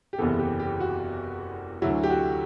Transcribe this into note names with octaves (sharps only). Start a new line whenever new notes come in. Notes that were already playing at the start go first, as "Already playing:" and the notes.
G4
F#1 E2 C3 E3 B3 A4
G4
G4
F#4
D2 D3 F#3 E4
G4
F#4